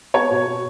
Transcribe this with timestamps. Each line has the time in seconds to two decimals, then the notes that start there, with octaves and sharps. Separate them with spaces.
0.14 B3 C#5
0.31 B2
0.46 B2